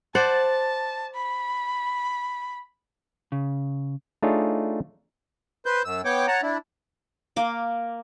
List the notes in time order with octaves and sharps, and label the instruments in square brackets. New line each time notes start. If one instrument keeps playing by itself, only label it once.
[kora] C5 D5 F#5 [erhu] A5
[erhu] B5
[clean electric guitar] C#3
[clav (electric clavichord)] A3 D4 D#4 F4 G#4 C#5
[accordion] B4 C5 G6
F#2 E6
B3 C#5 G5 D6
C#5 F#5 A5 A#5
D4 E4
[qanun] A#3 D6